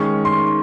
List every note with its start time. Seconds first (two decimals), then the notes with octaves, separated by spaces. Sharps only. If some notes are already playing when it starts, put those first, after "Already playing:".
Already playing: D#3 G#3 C#4 C#6
0.25 C6